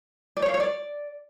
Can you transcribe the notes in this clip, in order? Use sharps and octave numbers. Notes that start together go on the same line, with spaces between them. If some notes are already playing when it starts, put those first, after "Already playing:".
D5
C#5
F5
C#5
D5